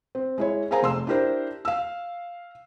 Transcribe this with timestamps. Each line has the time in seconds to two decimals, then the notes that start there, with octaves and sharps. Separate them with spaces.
0.15 C4
0.38 G#3 E4 C#5
0.71 G#4 A#4 C5 F5 G#5 A#5
0.83 F1 C6 E6
1.07 D4 E4 G4 A#4 C5
1.65 F5 E6